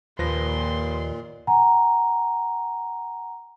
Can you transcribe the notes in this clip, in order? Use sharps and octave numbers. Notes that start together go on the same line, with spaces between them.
D#2 A#2 F3 B4 C6 A#6
F#5 G#5 A#5